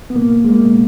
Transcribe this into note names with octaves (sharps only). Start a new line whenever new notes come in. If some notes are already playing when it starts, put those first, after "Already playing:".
B3
B2 A#3
B2
G#3
B2 A#3
B2